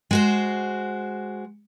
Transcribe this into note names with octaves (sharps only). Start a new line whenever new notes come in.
G#3 F#4 C5